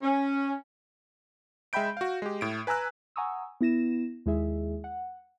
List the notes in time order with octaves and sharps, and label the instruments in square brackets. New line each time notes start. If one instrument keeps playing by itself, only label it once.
[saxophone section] C#4
[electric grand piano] G#3 E5 G5 B5 G6 D7
F#4 F5
G#3 G4
A2 D7
B4 G#5 A#5 E6 F#6
[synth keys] F#5 G#5 A#5 C#6 D#6 E6
B3 E4 A#6 E7
D#2 G#3 E4 G#4 E5
F#5